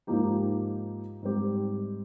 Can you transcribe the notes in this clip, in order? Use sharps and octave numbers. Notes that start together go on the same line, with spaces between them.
G#2 F3 A#3 D#4 G4
G#2 G3 C4 G4